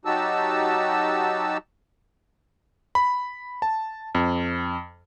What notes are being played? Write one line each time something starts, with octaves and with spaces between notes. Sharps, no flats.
F#3 D#4 F#4 G4 A5 E6
B5
A5
F2